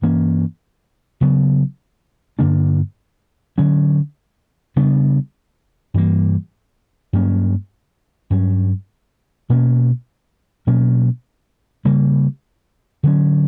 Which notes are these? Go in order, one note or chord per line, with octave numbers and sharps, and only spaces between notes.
G2 E3 A#3 C#4
C#3 F#3 B3
G2 D3 A#3 D4
D3 F#3 C#4
C#3 G3 B3 D4
G2 E3 G3 A#3
G2 F#3 A#3 C#4
G2 F#3 C#4
B2 A#3 C#4
B2 F#3 A#3 C#4
C#3 G3 A#3
D3 F#3 C#4